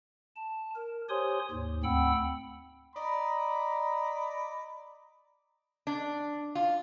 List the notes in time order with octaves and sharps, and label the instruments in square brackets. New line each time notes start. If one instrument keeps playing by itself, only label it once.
[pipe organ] A5
A#4
G4 C5 C#5 G#5 C6 D#6
D#2 G#2
D2 C4 F#5 G5 B5 E6
[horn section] D5 D#5 A#5 B5
[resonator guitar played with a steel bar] D4
F4